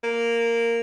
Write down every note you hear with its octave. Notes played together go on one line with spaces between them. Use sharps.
A#3